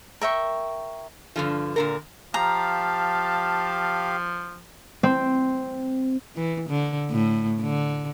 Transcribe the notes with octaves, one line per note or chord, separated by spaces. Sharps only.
A#4 E5 G5 C#6
G2 D3 F3
A#2 D3 A#4
F3 G4 F5 A5 A#5
C4
E3
D3
A2
D3